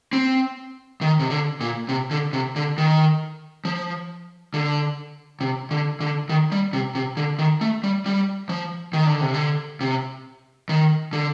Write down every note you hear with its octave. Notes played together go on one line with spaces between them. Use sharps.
C4
D#3
C3
D3
A#2
C3
D3
C3
D3
D#3
F3
D3
C3
D3
D3
D#3
G3
C3
C3
D3
D#3
A3
G3
G3
F3
D#3
D3
C3
D3
C3
D#3
D3